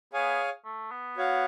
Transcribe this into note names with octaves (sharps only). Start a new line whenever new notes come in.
B3 G#4 C#5 F5 G#5
A3
B3
F#4 C#5 F5